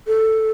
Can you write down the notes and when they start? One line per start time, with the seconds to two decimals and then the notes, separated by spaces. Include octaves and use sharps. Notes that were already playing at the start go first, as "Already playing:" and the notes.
0.07 A4